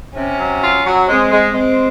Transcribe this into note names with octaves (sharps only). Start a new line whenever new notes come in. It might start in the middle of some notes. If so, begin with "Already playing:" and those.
C3 C#4
F#3
F4
F#3
G#3 C4
G#3
G#3 C4